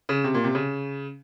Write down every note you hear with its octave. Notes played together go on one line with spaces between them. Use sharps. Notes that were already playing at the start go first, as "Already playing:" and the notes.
C#3
C3
A#2
C3
C#3